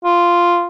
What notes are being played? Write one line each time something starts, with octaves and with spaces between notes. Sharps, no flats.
F4